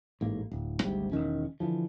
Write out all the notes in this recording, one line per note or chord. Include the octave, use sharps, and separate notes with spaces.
A1 G#2 A#3
D1
G#1 D2 G#2 G3
E1 C2 D#3 C#4
D3 E3 F3